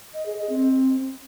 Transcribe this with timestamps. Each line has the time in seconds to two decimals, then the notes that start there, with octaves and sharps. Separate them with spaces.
0.14 D#5
0.26 G#4
0.38 D#5
0.50 C4